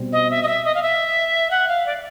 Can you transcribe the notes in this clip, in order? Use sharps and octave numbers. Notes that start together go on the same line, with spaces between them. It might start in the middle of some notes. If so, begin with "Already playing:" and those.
Already playing: B2 G3 C4
D#5
E5
D#5
E5
D#5
F5
E5
F#5
F5
D5